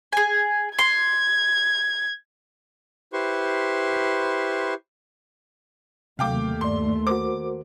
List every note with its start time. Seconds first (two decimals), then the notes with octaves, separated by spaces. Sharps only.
0.13 G#4 G#5
0.79 C6 G#6
3.13 E4 G4 B4 C5 C6 C#6
6.19 D#2 C3 F#3 A3 F5 G5 D6
6.61 G2 D5 C6
7.07 F#4 A#4 C5 D6